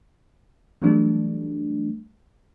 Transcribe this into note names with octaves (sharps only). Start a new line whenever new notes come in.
E3 F#3 G3 A3 D4